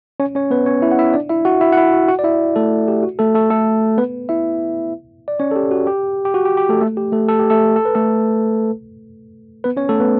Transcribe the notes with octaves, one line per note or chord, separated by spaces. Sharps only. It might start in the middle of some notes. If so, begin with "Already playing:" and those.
C#4 C#5
C#4 C#5
B3 B4
C#4 C#5
E4 E5
F#5
E4 E5
D4 D5
E4 E5
F#4 F#5
E4 E5
F#5
E4 E5
F#4 F#5
F#4 F#5
D5
E4 E5
A3 A4
G4
F#4
A3 A4
A3 A4
A3 A4
B3 B4
E4 E5
D5
C#4 C#5
A4
G4
F#4
G4
G4
F#4
G4
G4
A3 A4
A3 A4
G4
A3 A4
A4
G4
A3 A4
A4
B4
A3 A4
B3 B4
C#4 C#5
A3 A4
B3 B4